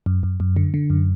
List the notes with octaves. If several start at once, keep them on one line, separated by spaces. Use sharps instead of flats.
F#2
F#2
F#2
D3
D3
F#2